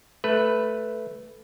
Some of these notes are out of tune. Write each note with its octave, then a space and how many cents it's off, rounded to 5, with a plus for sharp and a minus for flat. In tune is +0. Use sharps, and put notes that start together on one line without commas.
A3 +0 B4 +0